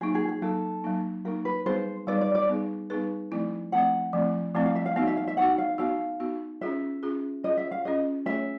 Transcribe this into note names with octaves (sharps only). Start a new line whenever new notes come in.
F#3 A#3 D#4 G#4
G#4
G#4
F#3 A#3 D#4 A4
F#3 A#3 D#4
F#3 A#3 D#4 A#4
B4
G3 B3 D#4 G#4 B4 C5
G3 B3 D#4 G#4 B4 D5
D5
D5
G3 B3 D#4 G#4 B4
G3 B3 D#4 G#4 B4
F3 A3 C4 E4
F3 A3 C4 E4 F#5
F3 A3 C4 E4
F3 A3 C4 E4 F5
F5
E5
F5
B3 D#4 F#4 F5
E5
F5
E5
B3 D#4 F#4 F#5
F5
B3 D#4 F#4 F5
B3 D#4 F#4
C#4 F4 G#4 E5
C#4 F4 G#4
C#4 F4 G#4 D#5
E5
F5
C#4 F4 G#4 D#5
A3 C#4 F4 G#4 C#5 E5